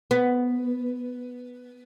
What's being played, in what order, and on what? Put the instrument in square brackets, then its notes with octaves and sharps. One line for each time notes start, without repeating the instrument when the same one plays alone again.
[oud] B3